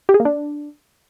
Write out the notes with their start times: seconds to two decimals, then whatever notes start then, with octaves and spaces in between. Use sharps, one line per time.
0.09 G4
0.14 G#4
0.20 A#3
0.25 D4